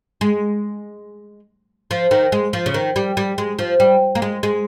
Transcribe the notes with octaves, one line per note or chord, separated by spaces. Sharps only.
G#3
F3
D#3
G#3
F3
C#3
D#3
G3
G3
G#3
F3
G3
A#3
G#3
G#3